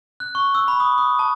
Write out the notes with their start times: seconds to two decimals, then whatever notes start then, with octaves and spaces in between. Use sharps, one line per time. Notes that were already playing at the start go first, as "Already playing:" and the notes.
0.20 F#6
0.35 C#6
0.55 E6
0.68 B5
0.80 D#6
0.98 D#6
1.19 A5